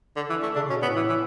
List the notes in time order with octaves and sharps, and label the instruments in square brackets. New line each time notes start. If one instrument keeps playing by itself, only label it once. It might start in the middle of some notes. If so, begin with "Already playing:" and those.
[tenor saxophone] D3
E3
A3
[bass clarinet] C#3 [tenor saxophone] D4
[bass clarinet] B2 [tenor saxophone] C#4
[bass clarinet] A2 [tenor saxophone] B3
[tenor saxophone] E3
E3